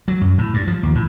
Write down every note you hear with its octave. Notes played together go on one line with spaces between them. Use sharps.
F#3
F#2
A2
G2
F3
D#2
A2